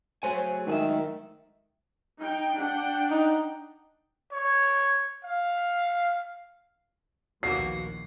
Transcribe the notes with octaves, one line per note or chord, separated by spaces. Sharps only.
F#3 A3 G#4 C5 C#5 G#5
G#2 D#3 G#4 E5
D#4 G5
D4 F#5 G5
D#4
C#5
F5
A#1 D#2 A#3 B3 F#4 C7